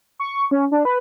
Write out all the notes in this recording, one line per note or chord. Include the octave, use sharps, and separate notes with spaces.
C#6
C#4
D4
B4